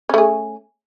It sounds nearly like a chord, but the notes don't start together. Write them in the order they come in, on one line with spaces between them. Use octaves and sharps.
C#4 A3 G#4